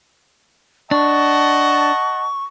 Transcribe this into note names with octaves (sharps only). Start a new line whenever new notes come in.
D4 D#5 F#5 A5 C#6